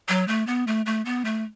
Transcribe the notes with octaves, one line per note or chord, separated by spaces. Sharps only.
F#3
A3
B3
A3
A3
B3
A3